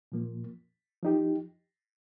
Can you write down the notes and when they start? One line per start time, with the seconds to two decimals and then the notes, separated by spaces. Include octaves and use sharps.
0.12 A#2 F3 A#3
1.03 F3 D#4 G4